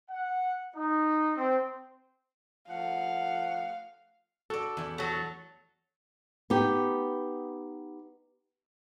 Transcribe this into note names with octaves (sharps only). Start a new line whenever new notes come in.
F#5
D#4
C4
F3 A3 F5 F#5
F#4 A4 D5
E2 E4
F#3 A3 F#4
B3 D#4 G4